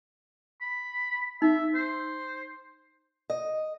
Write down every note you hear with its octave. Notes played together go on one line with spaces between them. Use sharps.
B5
D#4 E5
C5
D#5